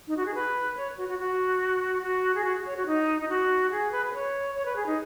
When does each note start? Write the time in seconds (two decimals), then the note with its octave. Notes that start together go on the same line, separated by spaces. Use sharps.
0.08 D#4
0.17 F#4
0.26 G#4
0.35 B4
0.77 C#5
0.98 F#4
1.08 F#4
1.19 F#4
2.03 F#4
2.35 G#4
2.44 F#4
2.65 C#5
2.77 F#4
2.86 D#4
3.22 D#4
3.29 F#4
3.71 G#4
3.92 B4
4.06 B4
4.14 C#5
4.55 C#5
4.66 B4
4.76 G#4
4.86 D#4